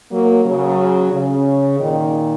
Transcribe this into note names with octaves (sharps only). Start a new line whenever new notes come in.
F#3 A#3
C#3 F#3
C#3
A#2 D#3